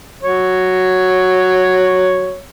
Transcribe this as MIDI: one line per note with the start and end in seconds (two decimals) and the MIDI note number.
0.23 2.41 54
0.23 2.41 73